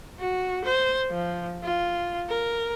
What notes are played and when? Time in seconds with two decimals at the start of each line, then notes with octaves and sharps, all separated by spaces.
0.19 F#4
0.64 C5
1.10 F3
1.63 F4
2.29 A#4